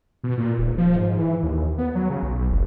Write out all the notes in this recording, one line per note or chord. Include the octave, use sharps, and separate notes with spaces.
B2
A#2
D#1
F3
G#2
E3
D#2
B3
F#3
C#3
B1
F1